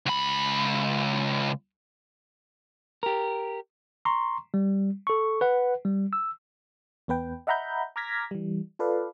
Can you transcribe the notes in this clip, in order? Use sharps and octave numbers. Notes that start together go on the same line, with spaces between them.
C#2 B5
G4 A#4
A#5 C6 C#6
G3
A4 C#6
B4 F#5
G3
E6
E2 B3 B4 G5
D#5 E5 F#5 A#5 B5 G6
A#5 D6 F6 G#6 A#6 B6
E3 G3
F4 A4 B4 D5 F5